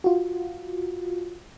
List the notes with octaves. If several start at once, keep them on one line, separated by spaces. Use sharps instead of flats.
F4 F#4